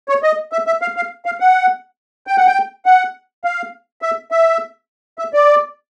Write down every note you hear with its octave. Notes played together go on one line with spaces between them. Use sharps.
C#5
D#5
E5
E5
F5
F5
F5
F#5
G5
F#5
G5
F#5
F5
E5
E5
E5
D5